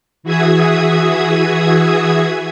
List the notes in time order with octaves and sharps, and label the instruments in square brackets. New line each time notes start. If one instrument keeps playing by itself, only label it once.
[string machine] E3 F#4 G#4 E5 D#6 G#6